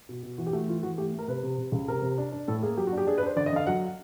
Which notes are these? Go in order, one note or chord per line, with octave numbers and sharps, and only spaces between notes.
B2
B2
E3 F#4
G4
A3 F#4
E3 F4
E3 F#4
A3 G4
A3
A#4
C3 B4
C3
C3
C#2
C3 A#4
C3
D4
D4
A2 A4
A#3 G#4
F#3 G4
F#4
D4
G4
D4 G#4
B4
D4 C5
D3 D5
D#5
D3 F5
F#3 F#5